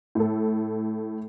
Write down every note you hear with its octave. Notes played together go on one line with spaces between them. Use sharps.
A2 A4